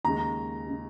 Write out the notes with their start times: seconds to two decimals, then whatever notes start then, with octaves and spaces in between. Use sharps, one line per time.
0.04 D#2 C#3 G#3 A#5
0.67 C#3 G#3